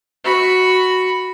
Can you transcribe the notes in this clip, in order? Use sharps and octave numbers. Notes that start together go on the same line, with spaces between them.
F#4 B5